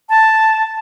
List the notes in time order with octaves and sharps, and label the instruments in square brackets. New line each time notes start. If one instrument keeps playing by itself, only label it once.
[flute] A5